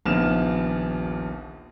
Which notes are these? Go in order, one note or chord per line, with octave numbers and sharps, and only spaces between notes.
D#1 A#1 D#2 B3 F6 E7